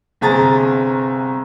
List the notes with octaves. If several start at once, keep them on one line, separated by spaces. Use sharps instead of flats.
G1 C3 G#4 A#5 A6